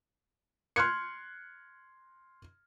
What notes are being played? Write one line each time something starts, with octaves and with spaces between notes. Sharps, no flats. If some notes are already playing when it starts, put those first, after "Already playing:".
C6 F6 F#6 G#6 C#7